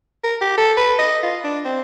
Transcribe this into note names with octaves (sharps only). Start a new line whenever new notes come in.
A#4
G4
A4
B4
D#5
F4
D4
C4